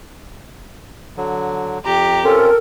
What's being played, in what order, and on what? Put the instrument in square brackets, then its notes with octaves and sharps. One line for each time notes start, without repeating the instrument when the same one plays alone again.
[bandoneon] D3 F#3
[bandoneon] F2 A#5 [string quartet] G4
[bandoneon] C4 C#4 F4 [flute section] A4 A#4